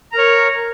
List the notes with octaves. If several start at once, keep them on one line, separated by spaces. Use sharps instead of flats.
A#4 C#5 A#5